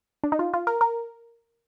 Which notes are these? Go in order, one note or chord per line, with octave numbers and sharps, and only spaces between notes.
D4
D#4
F4
F4
A#4
A#4